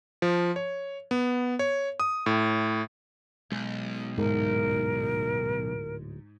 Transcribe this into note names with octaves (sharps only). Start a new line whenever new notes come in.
F3
C#5
B3
C#5
D#6
A2
B1 G#3
D1 G#2 A#4